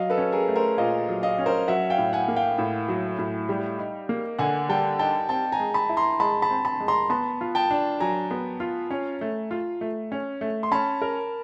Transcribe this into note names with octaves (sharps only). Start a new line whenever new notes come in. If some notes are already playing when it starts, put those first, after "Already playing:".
Already playing: F#3 D#5 F5
A4 B4
C#4
G#4 A#4
A3
A#4 C5
A#2 D#5 F5
F#3
D#5 F5
C#4
A#4 C5
F#3 E5 F#5
F5 G5
A2
F#5 G#5
A#3
F5 G5
A2
F#3
A2
G3
D#4
A#3
D3 F#5 G#5
G3 G5 A5
D#4 G5 A5
C4 G5 A5
G#5 A#5
G#3
A5 B5
E4
A#5 C6
G#3 A5 B5
A5 B5
C4
A5 B5
G#3
A#5 C6
B3 A5 B5
F4
G5 A5
D4
F#3 G#5 A#5
B3
F4
C#4
A3
F4
A3
C#4
A3
C6
C#4 A5 B5
A#4